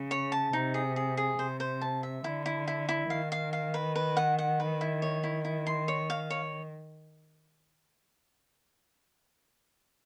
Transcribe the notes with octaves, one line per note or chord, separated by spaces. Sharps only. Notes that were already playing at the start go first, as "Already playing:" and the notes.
Already playing: C#3
C#5
A5
C3 D#4
G#4
G#4
G#4
C3 C5
C5
A5
E5
D3 E4
E4
E4
E4
D#3 F5
F5
F5
B4
B4
F#5
F#5
B4
E4
C#5
E4
E4
C6
C#5
F5
C#5